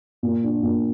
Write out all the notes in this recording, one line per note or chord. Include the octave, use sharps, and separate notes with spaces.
A#2
D4
A#2